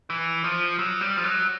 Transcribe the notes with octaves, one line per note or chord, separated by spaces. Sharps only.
E3
F3
F#3
G3
F3
F#3